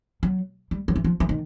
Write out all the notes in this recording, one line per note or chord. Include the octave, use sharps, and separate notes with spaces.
F#3
G3
F#3
E3
F3
E3
D#3